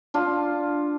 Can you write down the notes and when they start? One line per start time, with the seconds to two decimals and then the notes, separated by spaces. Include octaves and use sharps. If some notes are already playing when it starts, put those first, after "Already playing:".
0.14 D4 F4